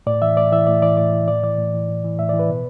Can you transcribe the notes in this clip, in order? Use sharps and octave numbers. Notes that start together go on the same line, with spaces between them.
A2 D5
E3 E5
A2 D5
E3 E5
A2 D5
E3 D5
A2 D5
E3
A2 D5
E3 D5
A2
E3
A2
E3
A2 E5
D5
E3
B4
B2